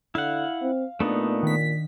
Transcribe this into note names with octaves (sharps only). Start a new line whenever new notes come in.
D3 E4 F5 F#5
C4
A#2 A3 B3 D4 D#4
D#3 B6